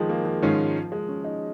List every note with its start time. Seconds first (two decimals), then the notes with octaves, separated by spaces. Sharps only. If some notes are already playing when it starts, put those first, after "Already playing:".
Already playing: D#3 F3 G#3
0.09 A#3
0.25 F3
0.42 G#2 D#3 G#3 C#4 F4
0.92 G#3
1.09 C#4
1.24 D#4